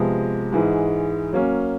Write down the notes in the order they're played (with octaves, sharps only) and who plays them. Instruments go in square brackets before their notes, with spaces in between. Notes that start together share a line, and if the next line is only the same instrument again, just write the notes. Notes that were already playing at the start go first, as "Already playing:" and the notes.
Already playing: [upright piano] C3 F3 G#3 B3
G#2 E3 G#3
F#3 A#3 C#4